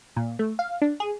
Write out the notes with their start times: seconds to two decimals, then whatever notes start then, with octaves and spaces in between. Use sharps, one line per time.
0.16 A#2
0.39 A3
0.59 F5
0.82 D4
1.00 G#4